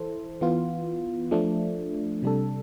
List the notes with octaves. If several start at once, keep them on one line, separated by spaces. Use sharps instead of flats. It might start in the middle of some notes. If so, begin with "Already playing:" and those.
Already playing: E3 E4 A4 C5
E3 B3 F4
F3 A3 D4
C3 G3 D4 A4